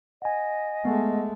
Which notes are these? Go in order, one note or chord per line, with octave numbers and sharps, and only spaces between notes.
D#5 F#5 G#5
G#3 A3 B3